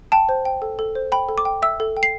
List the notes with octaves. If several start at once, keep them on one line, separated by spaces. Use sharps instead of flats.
G5 A5
C5
G5
A4
A4
C5
G5 B5
A4
D6
G5
E5 E6
A4
G5
C7